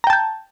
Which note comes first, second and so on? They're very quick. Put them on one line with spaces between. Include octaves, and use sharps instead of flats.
A#5 G5 A5 G6